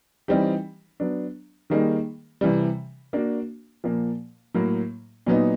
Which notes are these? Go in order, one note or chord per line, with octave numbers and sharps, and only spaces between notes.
E3 G3 C4 D#4 G4
F#3 B3 D4
D#3 G3 A#3 D#4 G#4
C3 E3 G3
A#3 D4 F#4
A#2 F3 A#3
A2 F#3 A#3
A#2 F#3 B3 D#4